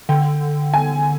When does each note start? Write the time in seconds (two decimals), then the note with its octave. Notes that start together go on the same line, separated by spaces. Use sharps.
0.09 D3 G5
0.74 G#5